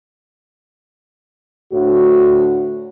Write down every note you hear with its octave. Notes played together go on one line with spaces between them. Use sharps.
D2 A2 D3 F#4